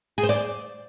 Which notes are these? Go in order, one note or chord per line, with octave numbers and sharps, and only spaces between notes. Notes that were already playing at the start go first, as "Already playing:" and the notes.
G#4
C5
D5